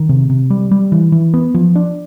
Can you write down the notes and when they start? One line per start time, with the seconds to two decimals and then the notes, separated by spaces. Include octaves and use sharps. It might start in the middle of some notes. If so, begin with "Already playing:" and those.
Already playing: D#3
0.09 C3
0.30 C3
0.50 G3
0.71 G3
0.92 E3
1.12 E3
1.34 B3
1.54 F3
1.76 D4